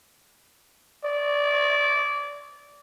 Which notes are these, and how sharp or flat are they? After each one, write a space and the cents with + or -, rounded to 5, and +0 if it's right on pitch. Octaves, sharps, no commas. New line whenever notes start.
D5 -20